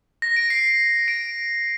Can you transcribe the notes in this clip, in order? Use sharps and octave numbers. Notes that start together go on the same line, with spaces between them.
A#6
D7
C7
D7